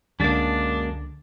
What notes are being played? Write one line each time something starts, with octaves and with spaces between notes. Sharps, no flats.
C#2 F#2 D3 G#3 A#3 D4 A6